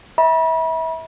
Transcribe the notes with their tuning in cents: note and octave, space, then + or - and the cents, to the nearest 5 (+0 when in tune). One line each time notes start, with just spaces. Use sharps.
E5 -30 B5 -35